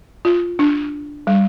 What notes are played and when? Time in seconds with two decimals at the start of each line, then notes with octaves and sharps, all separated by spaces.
0.25 F4
0.59 D4
1.27 G3